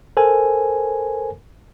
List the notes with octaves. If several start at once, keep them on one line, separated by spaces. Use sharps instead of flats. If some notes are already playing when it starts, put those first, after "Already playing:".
A4 A#4 C5 G#5